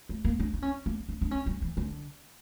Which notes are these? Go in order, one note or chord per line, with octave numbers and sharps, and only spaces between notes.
A3
A#3
D4
D4
C#4
A#3
D4
D4
C#4
G3
E3
D3